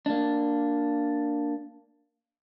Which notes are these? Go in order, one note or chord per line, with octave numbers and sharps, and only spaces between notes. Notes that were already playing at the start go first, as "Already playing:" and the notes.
A#3 D4